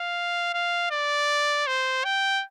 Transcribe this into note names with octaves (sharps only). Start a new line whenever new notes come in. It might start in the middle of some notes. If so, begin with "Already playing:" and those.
Already playing: F5
F5
D5
C5
G5